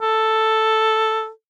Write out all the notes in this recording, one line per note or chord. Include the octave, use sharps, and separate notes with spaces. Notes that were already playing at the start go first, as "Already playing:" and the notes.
A4